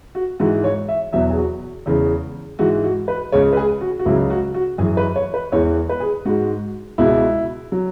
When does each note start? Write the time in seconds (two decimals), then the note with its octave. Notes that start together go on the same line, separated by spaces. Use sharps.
0.15 F#4
0.40 G#2 E3 G#3 F#4
0.64 C#5
0.89 E5
1.13 E2 B2 F#3 E5
1.30 G#4
1.37 F#4
1.86 E2 C#3 E3 G#3
2.59 G#2 E3 G#3 F#4
2.84 F#4
3.08 B4
3.32 C#2 C#3 G#3 C#5
3.53 B4
3.57 G#4
3.81 F#4
3.99 F#4
4.06 C#2 C#3 F#3 E4
4.30 F#4
4.54 F#4
4.78 F#2 E3 G#3 G#4
4.97 B4
5.16 C#5
5.34 B4
5.52 E2 E3 G#3 C#5
5.89 B4
6.00 G#4
6.25 G#2 G#3 F#4
6.98 C#2 B2 G#3 E4
7.72 F#3